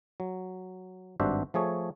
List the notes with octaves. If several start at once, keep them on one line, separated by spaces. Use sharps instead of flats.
F#3
G#1 G2 D4 F#4 C5 E5
F3 A3 G#4 C#5